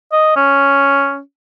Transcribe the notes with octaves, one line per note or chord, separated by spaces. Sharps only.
D#5
C#4